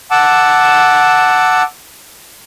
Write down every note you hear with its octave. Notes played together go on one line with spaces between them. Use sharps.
F#5 A5 D6 E6